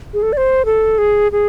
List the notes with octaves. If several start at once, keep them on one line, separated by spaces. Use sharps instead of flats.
G#4
A4
D5
C5
A4
G#4
G#4